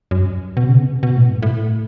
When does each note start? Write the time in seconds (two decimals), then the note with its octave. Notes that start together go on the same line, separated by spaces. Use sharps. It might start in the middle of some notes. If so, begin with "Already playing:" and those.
0.11 F#2
0.57 B2
0.69 C#3
0.79 B2
1.03 B2
1.16 A2
1.30 G2
1.43 A2